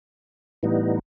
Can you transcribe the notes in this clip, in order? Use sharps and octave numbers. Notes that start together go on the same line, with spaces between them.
A2 E3 G3 B3 D#4